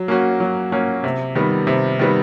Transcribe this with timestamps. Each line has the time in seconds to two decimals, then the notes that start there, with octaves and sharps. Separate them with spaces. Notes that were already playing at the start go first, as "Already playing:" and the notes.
Already playing: F#3
0.08 A#3 C#4 F#4
0.40 F#3
0.72 A#3 C#4 F#4
1.04 C3
1.35 D#3 G3 B3
1.67 C3
1.99 D#3 G3 B3